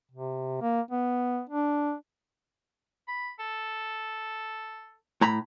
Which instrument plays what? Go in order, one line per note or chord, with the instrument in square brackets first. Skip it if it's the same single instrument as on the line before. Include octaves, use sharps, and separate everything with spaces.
[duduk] C3
A#3
B3
D4
[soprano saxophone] B5
A4
[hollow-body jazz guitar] A2 A#5 B5